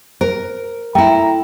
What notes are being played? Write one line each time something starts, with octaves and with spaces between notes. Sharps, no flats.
A#4 C5
A3 E4 G5 A#5